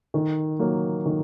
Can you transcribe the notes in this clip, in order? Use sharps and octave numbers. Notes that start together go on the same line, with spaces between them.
D#3
F#3 A#3
D#3